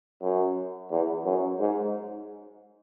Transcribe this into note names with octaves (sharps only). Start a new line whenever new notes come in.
F#2
E2
F#2
G#2